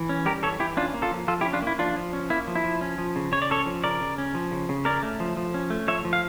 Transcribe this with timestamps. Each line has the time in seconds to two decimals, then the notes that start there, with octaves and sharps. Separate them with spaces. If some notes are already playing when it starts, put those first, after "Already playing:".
Already playing: E3
0.09 C#4
0.25 G3 G4 A#4
0.43 E3 A4 C#5
0.60 E3 E4 G4
0.77 C#4 D4 F4
0.94 A#3
1.02 F4 A4
1.12 F3
1.28 F3 F4 A4
1.41 E4 G4
1.45 C#4
1.53 D4 F4
1.62 A#3 E4
1.78 F3 D4 F4
1.96 F3
2.13 C#4
2.30 A#3 E4
2.47 F3
2.55 E4
2.64 F3
2.81 C#4
2.98 F3
3.16 C#3
3.32 C#3 C#5
3.42 D5
3.50 C#4 A4 C#5
3.66 F3
3.84 C#3 A#4 D5
4.01 C#3
4.18 C#4
4.35 F3
4.52 C#3
4.69 C#3
4.85 C#4 A#4 D5
5.03 A3
5.20 F3
5.37 F3
5.54 C#4
5.70 A3
5.88 F3 C#5 E5
6.05 F3
6.13 F5